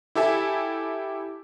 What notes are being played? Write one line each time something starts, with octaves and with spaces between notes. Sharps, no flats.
E4 G4 A4 E5 G#5